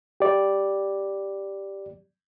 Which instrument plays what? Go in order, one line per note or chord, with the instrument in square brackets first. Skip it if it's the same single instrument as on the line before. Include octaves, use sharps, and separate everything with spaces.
[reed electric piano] G4 D5